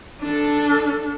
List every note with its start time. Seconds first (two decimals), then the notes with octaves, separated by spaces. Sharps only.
0.22 D4 A4